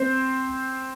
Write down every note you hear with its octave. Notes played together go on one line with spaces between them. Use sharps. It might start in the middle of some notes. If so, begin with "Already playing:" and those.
Already playing: C4 C5